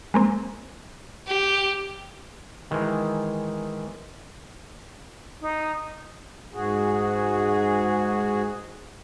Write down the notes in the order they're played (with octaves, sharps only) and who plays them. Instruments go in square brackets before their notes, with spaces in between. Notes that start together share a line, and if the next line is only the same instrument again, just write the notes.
[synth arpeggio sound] G#3 A#3 C4
[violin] G4
[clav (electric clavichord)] D#3 E3 G#3
[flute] D#4
[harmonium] G#2 F#4 G#4